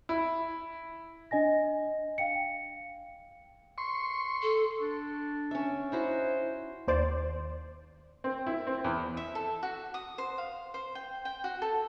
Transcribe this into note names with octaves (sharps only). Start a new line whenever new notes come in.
E4
D4 D#5 G#5 A#6
F5 G5 C#7
C6 C#6
A4
D4
C#4 E5
D#4 E4 F#4 C5
D#2 C5 D5
C4
E4
C4
E2
E5
A4
F#4
D#6
C5
F5
C5
G5
G5
F#4
A4